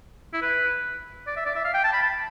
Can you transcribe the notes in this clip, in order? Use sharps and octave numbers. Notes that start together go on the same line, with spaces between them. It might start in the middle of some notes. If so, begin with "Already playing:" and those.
E4
B4
D5
E5
D5
E5
F5
G5
A5
B5
A5